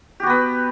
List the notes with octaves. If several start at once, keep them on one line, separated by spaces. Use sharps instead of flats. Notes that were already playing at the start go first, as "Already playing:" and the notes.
B3 F#4 G4 B4